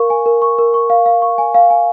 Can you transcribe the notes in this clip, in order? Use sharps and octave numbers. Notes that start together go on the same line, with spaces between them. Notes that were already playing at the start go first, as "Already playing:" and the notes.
Already playing: A#4 F5 C#6
G#5
A#4
C#6
A#4
C#6
F5
F5
C#6
G#5
F5
G#5